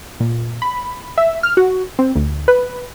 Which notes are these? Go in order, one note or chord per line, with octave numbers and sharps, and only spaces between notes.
A#2
B5
E5
F6
F#4
C4
D2
B4